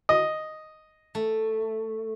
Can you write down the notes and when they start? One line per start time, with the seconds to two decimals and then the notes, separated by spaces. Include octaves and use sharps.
0.09 D#5
1.15 A3